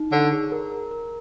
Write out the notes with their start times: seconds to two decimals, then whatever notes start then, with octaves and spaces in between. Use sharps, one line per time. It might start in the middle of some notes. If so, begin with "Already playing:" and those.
Already playing: D#4
0.12 D3 C#5
0.32 G#4
0.52 A#4
0.72 A#4
0.91 A#4